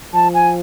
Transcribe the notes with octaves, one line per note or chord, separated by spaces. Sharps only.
F3 A5
G#5